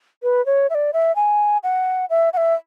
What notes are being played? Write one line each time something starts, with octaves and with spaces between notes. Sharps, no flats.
B4
C#5
E5
D5
E5
G#5
F#5
E5
F#5
E5